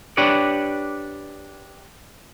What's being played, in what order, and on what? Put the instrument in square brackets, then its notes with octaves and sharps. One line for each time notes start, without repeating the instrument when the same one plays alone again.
[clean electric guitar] D4 G4 B4 C#5 D5